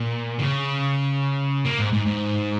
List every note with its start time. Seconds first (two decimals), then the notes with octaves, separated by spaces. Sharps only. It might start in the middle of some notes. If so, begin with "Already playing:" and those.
Already playing: A#2
0.39 C#3
1.66 A#3
1.79 G#2
1.93 G#2
2.07 G#2